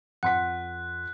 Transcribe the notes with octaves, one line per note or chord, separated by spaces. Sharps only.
F2 F#5 C6 F#6 B6